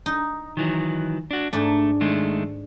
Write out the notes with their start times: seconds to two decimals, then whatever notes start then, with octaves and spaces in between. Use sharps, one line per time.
0.06 D#4
0.57 D#3 E3 F#3
1.31 D4 F#4
1.53 G#2 A3 D4
2.01 D#3 G#3 A3